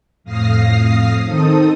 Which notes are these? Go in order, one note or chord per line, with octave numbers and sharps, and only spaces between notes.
F2 A2 F5 D#6 A#6 C7
D#3 C4 D#4 A4 D#6